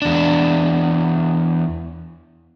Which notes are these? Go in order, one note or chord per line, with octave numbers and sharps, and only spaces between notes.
E2 D4